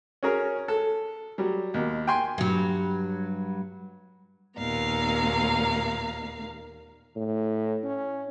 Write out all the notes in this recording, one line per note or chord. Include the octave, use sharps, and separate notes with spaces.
C#4 F#4 G#4 A#4
A4
F#3 G3
D#2 B2
G5 G#5 C6
G2 F#3
D#2 A#2 B3 F5 A#5
A2
C#4